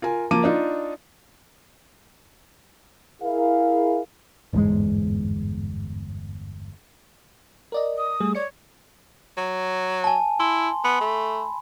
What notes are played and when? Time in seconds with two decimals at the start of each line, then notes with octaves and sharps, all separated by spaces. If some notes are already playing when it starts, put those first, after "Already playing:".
0.02 F4 A#4 G#5
0.31 F3 A#3 A5 D6 D#7
0.44 D4 D#4 F4
3.22 E4 G#4 A#4 F5
4.53 G1 E2 G#2 G#3
7.72 A#4 D5 D#5
7.98 D#6
8.20 G3 A3 G#4
8.35 C#5 D5 C#7
9.37 F#3
10.04 G#5 A5
10.40 E4 C6
10.85 B3 B5
11.01 A3